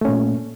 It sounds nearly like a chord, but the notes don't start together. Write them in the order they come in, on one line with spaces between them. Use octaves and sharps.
A3 C#4 A#2